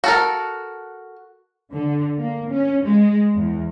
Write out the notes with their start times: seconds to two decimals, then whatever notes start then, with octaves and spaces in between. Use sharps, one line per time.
0.04 F#4 A4 A#4
1.71 D3
2.18 A#3
2.51 C#4
2.83 G#3
3.36 E2